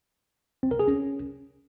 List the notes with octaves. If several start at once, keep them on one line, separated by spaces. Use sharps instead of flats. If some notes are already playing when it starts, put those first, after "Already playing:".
C4
A#4
G#4
C#4